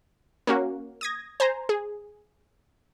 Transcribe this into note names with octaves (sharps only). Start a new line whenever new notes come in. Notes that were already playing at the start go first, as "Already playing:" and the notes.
A#3 C#4 F#4
D#6 G#6 A#6
C5 G#5 A#5
G#4